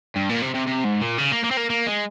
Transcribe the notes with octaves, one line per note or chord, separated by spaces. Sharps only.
G2
A#2
C3
C3
C3
G#2
A#2
C#3
A#3
A#3
C4
A#3
A#3
G#3